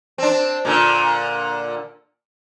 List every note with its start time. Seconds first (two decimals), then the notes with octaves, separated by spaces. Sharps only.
0.18 C4 D4
0.65 A#2 D3